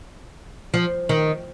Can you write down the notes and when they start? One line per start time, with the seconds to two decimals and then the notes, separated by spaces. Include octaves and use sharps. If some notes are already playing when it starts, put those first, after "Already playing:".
0.74 F3
1.09 D#3